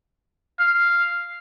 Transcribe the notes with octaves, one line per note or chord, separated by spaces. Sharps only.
F5